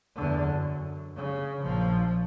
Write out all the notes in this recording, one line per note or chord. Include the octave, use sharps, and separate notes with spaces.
E2 D3
F#2
C#3
A#1 F3